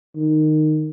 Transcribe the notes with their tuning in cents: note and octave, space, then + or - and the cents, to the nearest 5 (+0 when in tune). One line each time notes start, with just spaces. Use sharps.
D#3 -15